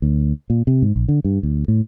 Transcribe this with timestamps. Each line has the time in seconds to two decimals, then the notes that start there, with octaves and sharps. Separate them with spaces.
0.02 D2
0.50 A#2
0.67 C3
0.82 G#2
0.96 A#1
1.08 D3
1.24 G2
1.43 D2
1.68 A2